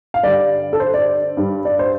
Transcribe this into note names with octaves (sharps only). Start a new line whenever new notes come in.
F5
G2 D3 G3 D5
A4
C5
D5
G2 G3
D5
C5